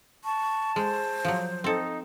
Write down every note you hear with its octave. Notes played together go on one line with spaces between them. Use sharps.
A5 C#6
G#3 C5
F3 F#3
C4 D#4 A4